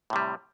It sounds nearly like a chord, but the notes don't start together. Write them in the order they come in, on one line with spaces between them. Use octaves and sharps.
A2 C3 G3